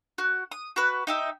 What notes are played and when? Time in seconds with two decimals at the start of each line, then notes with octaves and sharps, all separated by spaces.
0.18 F#4
0.51 D#6
0.76 F#4 B4
1.07 D#4 G4 E5